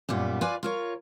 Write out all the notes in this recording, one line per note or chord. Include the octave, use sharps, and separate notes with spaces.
F#2 A#2 G3 B3
F4 B4 D5 G#5
F4 A#4 C#5